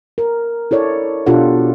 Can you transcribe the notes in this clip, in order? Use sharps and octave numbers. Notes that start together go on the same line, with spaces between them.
A#4
E4 A4 C#5 D5
B2 D4 F4 G4 A4 F#5